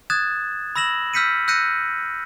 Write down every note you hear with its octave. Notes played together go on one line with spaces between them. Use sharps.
D#6 F#6 G#6 A6 E7
B5 E6 A#6 E7 F#7
E6 F6 G6 B6 C#7 D#7
E6 F#6 G6 A#6 C#7 D#7